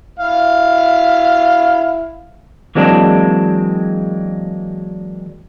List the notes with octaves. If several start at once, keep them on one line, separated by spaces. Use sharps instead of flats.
E4 F5
E3 F#3 G#3 A#3 C4 D4